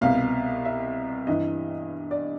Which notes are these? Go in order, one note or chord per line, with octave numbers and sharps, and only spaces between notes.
C2 B2 F5
E5
G2 E3 D#5
D5